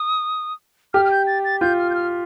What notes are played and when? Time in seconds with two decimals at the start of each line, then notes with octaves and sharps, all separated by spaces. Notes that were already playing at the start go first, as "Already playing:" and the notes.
Already playing: D#6
0.94 G4 F6
1.05 F6
1.11 G6
1.27 A6
1.44 A6
1.61 F4 G6
1.78 F6
1.90 G6
1.95 F6